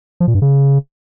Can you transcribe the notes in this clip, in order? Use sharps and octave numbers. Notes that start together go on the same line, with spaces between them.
F3
A#2
G2
C#3